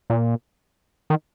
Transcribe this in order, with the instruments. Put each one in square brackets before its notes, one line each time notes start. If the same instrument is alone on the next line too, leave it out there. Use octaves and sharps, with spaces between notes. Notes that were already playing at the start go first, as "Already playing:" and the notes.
[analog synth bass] A#2
D#3